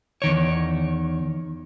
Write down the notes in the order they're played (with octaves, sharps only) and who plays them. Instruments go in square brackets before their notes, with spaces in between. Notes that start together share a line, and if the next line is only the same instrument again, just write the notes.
[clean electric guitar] E2 D#3 C#5